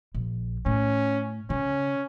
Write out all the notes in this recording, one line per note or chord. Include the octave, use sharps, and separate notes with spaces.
A#1
A2 C#4
C#3 C#4